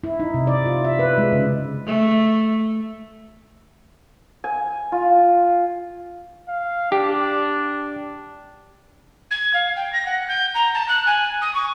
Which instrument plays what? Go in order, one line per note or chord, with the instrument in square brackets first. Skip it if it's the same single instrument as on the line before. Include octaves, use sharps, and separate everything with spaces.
[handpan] E4
D#4
C3
D5
F4
E5
B4
G#3
C#3
[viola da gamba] A3
[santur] G#5
F4
[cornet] F5
[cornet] D4 [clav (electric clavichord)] G4
[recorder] G#6
F5
G5
A#6
F#5
G6
A#5
A5
F#6
G#5
D#6
C#6